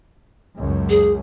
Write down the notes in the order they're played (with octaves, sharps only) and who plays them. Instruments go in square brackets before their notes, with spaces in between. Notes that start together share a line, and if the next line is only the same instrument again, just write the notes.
[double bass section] C#2 F#2
[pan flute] G#4